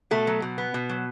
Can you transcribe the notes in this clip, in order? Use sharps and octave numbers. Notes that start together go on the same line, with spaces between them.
B2 A3 A4
F#3
B2
B3
B2
F#3